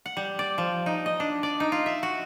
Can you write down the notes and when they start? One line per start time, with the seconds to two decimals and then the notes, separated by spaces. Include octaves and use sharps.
0.06 F#5
0.17 G3
0.39 D5
0.58 F3
0.86 D#4
1.06 D#5
1.20 D4
1.43 D5
1.60 D#4
1.72 F4
1.86 E5
2.03 F#4